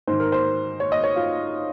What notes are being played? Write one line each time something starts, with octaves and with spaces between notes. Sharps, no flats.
G#2 D#3 C5
A#4
C5
C#5
D#5
C#5
F4